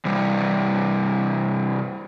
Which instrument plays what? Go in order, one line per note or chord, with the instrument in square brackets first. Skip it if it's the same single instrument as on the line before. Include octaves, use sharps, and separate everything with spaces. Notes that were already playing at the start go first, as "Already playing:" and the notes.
[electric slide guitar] C3 E3 G3